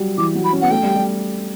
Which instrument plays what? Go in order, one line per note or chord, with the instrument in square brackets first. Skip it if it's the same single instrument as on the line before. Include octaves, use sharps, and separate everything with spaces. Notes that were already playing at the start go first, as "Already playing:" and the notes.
Already playing: [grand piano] F#3 G3
[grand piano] E3 [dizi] D6
[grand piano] F#3
[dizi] B5
[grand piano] C#4
[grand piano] B3 [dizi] F#5
[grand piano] A3 [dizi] G5
[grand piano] G3
G3